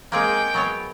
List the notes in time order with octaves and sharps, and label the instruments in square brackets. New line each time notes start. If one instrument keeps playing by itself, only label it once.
[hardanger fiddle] G#3 G5 [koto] A#3 C4 G#4
[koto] F#3 B3 C#5